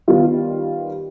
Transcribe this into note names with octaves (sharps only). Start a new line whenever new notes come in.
D#3 G3 B3 F4